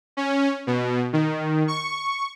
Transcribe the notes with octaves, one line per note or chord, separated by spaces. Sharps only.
C#4
B2
D#3
C#6